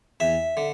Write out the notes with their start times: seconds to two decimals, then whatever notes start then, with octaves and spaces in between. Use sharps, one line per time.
0.20 E2 E5
0.57 D3